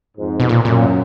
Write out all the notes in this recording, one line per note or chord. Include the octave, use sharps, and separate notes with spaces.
F2 G#2
B2
A#2
F#2 A#2